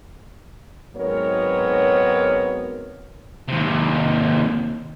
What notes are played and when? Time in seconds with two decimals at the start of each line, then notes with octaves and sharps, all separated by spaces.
0.96 G#2 F#3 B3 C4 A#4 C#5
3.48 D#2 C3